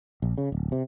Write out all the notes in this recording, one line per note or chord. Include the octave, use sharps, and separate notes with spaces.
A#1
C#3
D1
C3